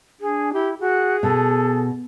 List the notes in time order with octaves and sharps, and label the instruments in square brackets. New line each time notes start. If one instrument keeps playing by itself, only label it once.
[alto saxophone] D4 [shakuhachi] G#4
[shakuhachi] E4 [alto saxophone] G4
[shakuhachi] F#4 [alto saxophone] G#4
[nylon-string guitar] B2 [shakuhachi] A4